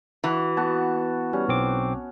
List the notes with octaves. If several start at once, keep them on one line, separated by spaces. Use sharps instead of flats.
E3 F#4
B3 F#4 A5
G3 C#4
B1 C4 D6